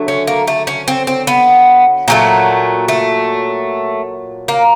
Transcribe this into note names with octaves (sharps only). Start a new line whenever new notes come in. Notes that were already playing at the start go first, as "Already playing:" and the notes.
Already playing: D3 F#3 A3
C#4
A#3
A3
C#4
C4
C4
B3
A#2 F#3 A3 A#3
A3
A#3